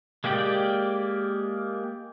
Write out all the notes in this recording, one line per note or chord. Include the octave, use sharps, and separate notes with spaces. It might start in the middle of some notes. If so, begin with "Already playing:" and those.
G#3 A#3 G4 D5 G5